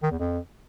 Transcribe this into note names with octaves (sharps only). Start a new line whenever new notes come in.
D#3
E2
F2